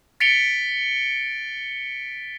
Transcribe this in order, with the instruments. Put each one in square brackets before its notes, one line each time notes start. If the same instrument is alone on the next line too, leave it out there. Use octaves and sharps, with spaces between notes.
[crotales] A6 B6 C#7 D7 F7 G7